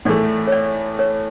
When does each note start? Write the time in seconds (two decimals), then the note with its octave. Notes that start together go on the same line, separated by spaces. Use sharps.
0.05 A2 E3 A3 D5
0.48 C#5
0.52 D5
0.99 C#5